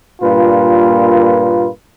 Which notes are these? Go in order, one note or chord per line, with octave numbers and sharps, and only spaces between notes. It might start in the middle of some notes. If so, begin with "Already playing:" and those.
G2 A#2 A#3 F4 B4